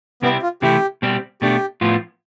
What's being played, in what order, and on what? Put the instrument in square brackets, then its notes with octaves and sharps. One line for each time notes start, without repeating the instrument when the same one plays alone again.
[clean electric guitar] C3 G3 C4 E4 [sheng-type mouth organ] B3
[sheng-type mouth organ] F4
[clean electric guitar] C3 E3 A3 E4 [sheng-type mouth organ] G4
[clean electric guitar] B2 G3 C4
[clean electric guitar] B2 A3 D4 [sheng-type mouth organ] G4
[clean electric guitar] A2 F3 B3 F4